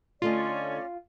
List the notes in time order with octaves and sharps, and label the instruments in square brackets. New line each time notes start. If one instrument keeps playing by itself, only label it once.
[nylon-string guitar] D3 A3 D#5 [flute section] C#4 D5 [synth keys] F4